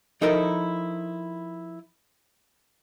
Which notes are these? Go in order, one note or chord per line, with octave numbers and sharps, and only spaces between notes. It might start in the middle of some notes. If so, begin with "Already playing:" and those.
F3 D#4 E4 A4 A#4 D#5